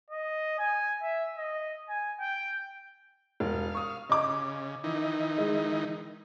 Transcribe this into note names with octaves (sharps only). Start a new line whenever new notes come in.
D#5
G#5
E5
D#5
G#5
G5
E1 F5
C#6 D#6
C#3 D#5 D6
D#3 E3 D#4
G#3